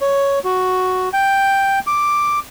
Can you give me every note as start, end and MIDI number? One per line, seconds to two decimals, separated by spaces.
0.01 0.39 73
0.45 1.09 66
1.13 1.79 79
1.87 2.39 86